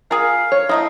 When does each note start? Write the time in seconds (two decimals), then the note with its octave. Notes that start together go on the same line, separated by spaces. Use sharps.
0.11 F4 G#4 A#4 F5
0.52 C#5
0.69 A3 D#4 E4 D#5